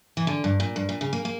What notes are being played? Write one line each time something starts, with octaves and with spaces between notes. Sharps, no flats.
E3
D3
G2
A#2
G2
A#2
C#3
A#3
A#3